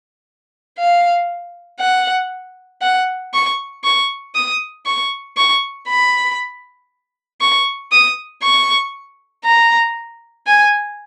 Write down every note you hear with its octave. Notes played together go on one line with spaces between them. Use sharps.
F5
F#5
F#5
C#6
C#6
D#6
C#6
C#6
B5
C#6
D#6
C#6
A#5
G#5